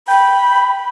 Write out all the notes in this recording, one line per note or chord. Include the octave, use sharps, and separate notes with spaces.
G5 B5